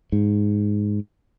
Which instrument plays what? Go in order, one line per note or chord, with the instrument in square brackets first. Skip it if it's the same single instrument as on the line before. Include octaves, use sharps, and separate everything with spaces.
[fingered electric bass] G#2